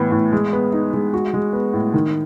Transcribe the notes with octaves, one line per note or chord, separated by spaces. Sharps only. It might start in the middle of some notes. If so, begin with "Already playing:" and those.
Already playing: A2 E3 B3
A2
G#3
B3
D#4
G#3
F#4
G#3
B3
A2
D#3